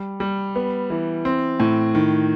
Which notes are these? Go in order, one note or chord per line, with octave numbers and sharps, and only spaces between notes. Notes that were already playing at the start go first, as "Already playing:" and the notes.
Already playing: G3
G3
B3
E3
C4
A2
D#3